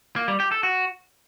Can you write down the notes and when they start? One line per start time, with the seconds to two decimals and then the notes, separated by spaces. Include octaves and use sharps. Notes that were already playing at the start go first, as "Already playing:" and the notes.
0.16 A#3
0.28 G3
0.40 G4
0.51 A4
0.63 F#4